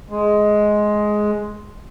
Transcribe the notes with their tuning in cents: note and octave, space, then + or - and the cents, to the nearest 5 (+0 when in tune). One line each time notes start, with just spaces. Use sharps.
G#3 +10